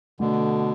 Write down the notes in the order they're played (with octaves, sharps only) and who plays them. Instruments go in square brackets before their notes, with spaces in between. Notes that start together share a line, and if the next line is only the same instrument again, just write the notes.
[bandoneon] B2 D3 [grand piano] A3